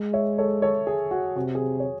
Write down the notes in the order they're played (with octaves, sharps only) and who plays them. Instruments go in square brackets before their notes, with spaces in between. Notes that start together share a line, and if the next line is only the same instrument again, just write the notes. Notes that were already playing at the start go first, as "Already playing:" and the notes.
Already playing: [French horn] G#3
[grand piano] C#5 E5
A4 C#5
A4 C#5
G#4
F#4
[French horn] C3 [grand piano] F#4
[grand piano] G#4
C#5